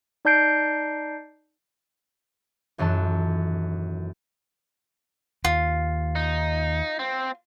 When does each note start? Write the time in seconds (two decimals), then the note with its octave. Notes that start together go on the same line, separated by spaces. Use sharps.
0.25 D#4 D5 A5 G6 C7 D7
2.78 D#1 F#2 E3 A4 A5
5.45 D#2 F4
6.16 D#4
6.99 C4